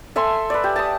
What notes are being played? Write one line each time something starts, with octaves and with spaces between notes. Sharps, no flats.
A4 E5 G#5 C6
B4 D5
G4
A5 D#6